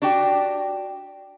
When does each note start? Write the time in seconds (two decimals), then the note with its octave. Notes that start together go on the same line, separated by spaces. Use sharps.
0.02 D4 F#4 G4 G5